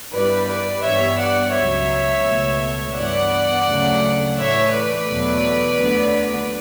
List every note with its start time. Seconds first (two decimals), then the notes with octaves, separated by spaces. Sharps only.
0.13 G2 E3 G3 B3 B4 D5
0.48 B4 D5
0.84 G2 E3 G3 B3 C#5 E5
1.19 D5 F#5
1.55 C#2 B2 F#3 C#5 E5
2.25 C#2 B2 A3
2.96 G2 E3 B3 D5 F#5
3.66 D2 C#3 F#3 A3
4.37 A2 E3 A3 C#5 E5
4.72 B4 D5
5.08 E2 B2 F#3 A3
5.78 D2 D3 F#3 B3